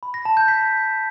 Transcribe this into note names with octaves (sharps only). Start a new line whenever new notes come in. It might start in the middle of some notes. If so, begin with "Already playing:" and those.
B5
A#6
A5
G6
B6